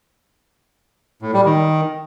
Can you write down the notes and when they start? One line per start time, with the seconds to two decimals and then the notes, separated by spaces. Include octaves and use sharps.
1.22 A2
1.34 G3
1.45 D#3